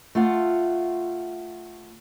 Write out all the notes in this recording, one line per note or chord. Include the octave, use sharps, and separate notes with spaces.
A3 F4 F#5